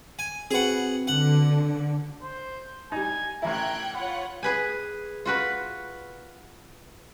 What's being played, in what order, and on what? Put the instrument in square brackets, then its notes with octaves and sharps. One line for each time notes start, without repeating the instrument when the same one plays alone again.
[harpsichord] G#5
[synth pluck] C4 F#4 B4 [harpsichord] G#4 F#5
[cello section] D3 [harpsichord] F#5
[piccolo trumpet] C5
[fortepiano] G3 D#4 [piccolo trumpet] G#5
[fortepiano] A1 E3 E4 [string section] G5 F#6 G#6 [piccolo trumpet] A#5
[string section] F4 C#5 F#5 [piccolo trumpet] B5
[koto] G#4 B4 G#5
F4 F#4 B4